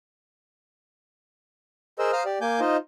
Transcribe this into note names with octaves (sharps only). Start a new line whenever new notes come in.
G#4 A#4 C5 D#5 E6
C5 F5 A#5 D#6 F6
G4 D5
A#3 G#5 D6 G6
D#4 F4 C5 D#5